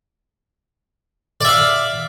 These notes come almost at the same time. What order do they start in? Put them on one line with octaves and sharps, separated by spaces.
D5 E5 F5